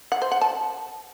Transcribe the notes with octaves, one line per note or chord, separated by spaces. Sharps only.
F#5
C5
F#5
A5